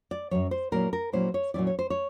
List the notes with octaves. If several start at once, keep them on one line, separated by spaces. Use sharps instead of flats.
D5
F#2 D#3 F#3 C#5
C5
A#2 F#3 A#3 C#4 E4 A#4
A#4
A#2 F#3 A#3 C#4 E4 C5
C#5
A#2 F#3 A#3 C#4 E4 D5
C#5
C5
C#5